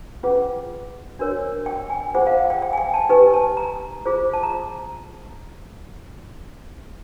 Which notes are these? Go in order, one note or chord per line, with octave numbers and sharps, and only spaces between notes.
C#4 F4 G#4 B4 F#5
D4 F#4 A#4 C#5
G5
G#5
F4 G#4 C5 F#5
F5
F#5
G5
G5
G#5
G5
A5
D#4 G4 B4 G#5
A5
A#5
F4 G#4 C5
A5
A#5